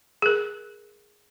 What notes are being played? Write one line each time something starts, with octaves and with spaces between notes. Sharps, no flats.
G#4 A#4